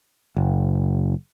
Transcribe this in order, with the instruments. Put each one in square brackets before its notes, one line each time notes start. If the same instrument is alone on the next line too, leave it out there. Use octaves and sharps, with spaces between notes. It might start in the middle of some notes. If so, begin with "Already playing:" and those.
[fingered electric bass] F#1